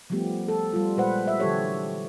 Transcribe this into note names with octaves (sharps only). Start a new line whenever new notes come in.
F3 G3 A3 B3 G4
A4
G3 F4
A#2 G#3 B4 C5 F#5
E5
D3 E3 F#3 G4 A4 C#5